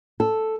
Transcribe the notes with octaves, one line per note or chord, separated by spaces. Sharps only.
A4